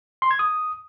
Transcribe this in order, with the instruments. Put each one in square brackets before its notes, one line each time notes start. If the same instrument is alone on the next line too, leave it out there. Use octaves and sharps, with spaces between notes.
[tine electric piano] C6
G#6
D#6